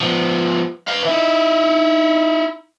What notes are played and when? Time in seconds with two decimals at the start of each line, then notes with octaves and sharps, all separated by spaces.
0.01 F3 B3
0.88 B4 F5
1.05 D#4 E4